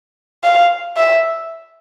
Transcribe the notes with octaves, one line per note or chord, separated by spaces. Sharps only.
F5
E5